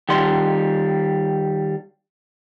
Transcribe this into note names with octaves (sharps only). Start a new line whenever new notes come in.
D#3 G3 C6